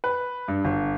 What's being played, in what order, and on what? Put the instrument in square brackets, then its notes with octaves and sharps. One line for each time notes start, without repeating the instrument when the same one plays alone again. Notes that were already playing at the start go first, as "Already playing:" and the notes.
[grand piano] B4
G2
G1